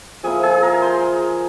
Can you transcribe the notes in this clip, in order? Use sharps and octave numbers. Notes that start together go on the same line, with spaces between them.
F3 A#3 E4 G#4 G#5
G#4 G#5
A#4 A#5
C5 C6